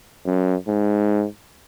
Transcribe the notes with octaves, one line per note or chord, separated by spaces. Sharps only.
F#2
G#2